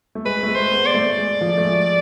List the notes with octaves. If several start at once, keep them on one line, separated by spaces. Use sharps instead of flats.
A3
G#3 B4
A3
G#3
C5
B3
D5
A3
G#3
F3
A3
G#3